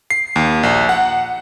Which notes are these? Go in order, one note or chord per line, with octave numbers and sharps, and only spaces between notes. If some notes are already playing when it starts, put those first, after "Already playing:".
C7
D#2
A#1
F#5